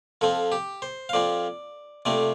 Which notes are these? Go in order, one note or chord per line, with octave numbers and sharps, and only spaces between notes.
F2 F3 C4 A4
G4
C5
F5
F2 F3 C4 D5
F2 C3 A3 C4 D5